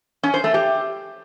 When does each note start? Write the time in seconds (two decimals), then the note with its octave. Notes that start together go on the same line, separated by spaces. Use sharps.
0.23 C#4
0.34 C5
0.44 A3
0.54 G4